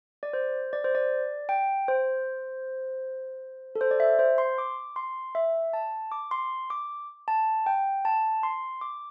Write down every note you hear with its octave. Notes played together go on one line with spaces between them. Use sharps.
D5
C5
D5
C5
D5
G5
C5
A4
C5
D5
E5
C5
C6
D6
C6
E5
A5
D6
C6
D6
A5
G5
A5
C6
D6